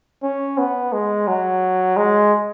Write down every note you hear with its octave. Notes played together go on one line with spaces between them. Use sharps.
C#4
B3
G#3
F#3
G#3